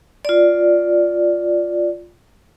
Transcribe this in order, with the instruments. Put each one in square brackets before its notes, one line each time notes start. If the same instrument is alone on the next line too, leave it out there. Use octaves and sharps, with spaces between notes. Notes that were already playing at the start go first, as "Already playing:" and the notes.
[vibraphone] F4 D5